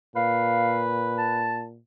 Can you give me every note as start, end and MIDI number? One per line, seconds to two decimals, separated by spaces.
0.16 1.79 46
0.16 1.45 71
0.16 0.86 77
1.18 1.62 81